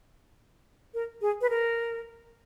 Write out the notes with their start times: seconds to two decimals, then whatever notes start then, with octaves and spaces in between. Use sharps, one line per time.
0.94 A#4
1.21 G#4
1.41 B4
1.50 A#4